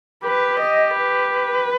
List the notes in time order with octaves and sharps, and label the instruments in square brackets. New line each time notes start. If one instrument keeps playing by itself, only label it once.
[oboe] G4 [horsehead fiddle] B4
[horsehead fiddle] D#5
B4